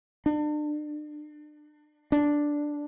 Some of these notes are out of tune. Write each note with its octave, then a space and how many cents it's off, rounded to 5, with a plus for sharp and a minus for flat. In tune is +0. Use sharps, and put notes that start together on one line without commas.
D4 +35
D4 +0